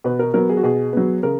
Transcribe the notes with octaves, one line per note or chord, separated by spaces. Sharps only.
B2 B4
A#4
F#3 B3 A#4
G#4
F#4
B2 G#4
F#3 B3
C#3 A#4